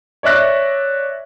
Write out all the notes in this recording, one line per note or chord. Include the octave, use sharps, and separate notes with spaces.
C#5 D5 E5 F#6 A#6